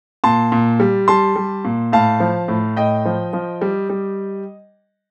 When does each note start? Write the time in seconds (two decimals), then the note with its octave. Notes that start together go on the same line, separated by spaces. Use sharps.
0.24 A#2 A5 C6
0.52 A#2
0.80 G3
1.08 G3 A5 C6
1.36 G3
1.65 A#2
1.93 A2 F5 A5
2.20 F3
2.48 A2
2.76 A2 D#5 G5
3.05 F3
3.33 F3
3.61 G3
3.90 G3